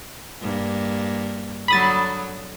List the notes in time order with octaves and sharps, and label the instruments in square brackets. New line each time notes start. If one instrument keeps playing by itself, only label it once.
[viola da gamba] G2 A#3
[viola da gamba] D3 F#3 [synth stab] B5 D#6 A6